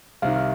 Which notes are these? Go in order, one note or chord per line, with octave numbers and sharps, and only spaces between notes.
C2 C3 D#3 F5